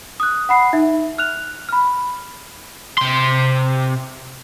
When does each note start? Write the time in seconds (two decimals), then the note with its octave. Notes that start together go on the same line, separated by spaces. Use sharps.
0.20 D#6 F#6
0.49 F#5 B5 C7
0.73 D#4 E5
1.18 F6 F#6 F7
1.69 B5 F6
2.98 C3 C6